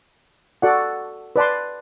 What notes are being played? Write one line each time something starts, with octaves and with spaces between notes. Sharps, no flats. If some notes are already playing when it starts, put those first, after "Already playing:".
F#4 A4 D5 F#5
B4 D5 A5 C6